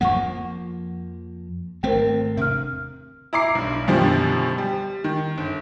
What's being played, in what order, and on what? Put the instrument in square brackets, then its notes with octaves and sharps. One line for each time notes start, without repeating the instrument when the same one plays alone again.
[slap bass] F2 F3 A#3 [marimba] F#5 C#6
[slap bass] G#1 A3 C4 [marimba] A#4 C5 G5
[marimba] E2 F6 [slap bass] C3
[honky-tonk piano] E4 A#5 D6 C7
B1 G2
F#2 B2 D3 D#3 F3 G3
G3
D#3
G1